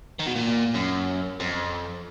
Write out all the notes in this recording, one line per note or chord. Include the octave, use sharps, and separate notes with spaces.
D#3
B2
A#2
F#2
F2